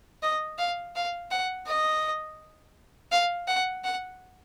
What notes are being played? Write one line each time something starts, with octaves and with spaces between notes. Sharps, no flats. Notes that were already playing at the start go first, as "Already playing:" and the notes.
D#5
F5
F5
F#5
D#5
F5
F#5
F#5